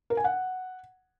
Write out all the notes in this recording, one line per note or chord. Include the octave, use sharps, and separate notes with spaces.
A#4
G#5
F#5